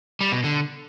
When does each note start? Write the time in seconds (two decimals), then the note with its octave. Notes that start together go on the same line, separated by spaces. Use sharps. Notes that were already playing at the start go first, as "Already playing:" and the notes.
0.21 G3
0.32 B2
0.44 D3